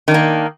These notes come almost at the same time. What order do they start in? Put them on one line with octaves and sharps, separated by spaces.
D#3 D4 A#3